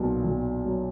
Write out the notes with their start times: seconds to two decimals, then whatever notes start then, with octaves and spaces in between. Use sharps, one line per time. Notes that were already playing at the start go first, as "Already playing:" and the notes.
Already playing: B1 A#2
0.24 B1
0.65 F#3